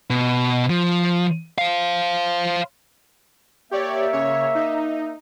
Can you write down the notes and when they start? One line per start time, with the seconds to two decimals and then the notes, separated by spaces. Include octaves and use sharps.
0.10 B2
0.70 F3
1.58 C5 F5
3.71 A#3 G4 C#5 D5 E5
4.13 C#3 C#5
4.55 D#4